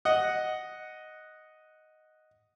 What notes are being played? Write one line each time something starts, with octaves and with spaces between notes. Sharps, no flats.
D#5 F#5